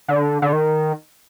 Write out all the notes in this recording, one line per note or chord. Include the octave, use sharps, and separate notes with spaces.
D3
D3
D#3